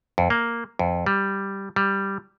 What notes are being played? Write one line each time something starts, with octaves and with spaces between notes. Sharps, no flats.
F2
A#3
F2
G3
G3